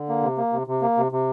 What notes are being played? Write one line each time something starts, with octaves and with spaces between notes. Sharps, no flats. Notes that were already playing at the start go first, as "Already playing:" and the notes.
Already playing: D3
A#3
C3
A#3
C3
C3
A#3
C3
C3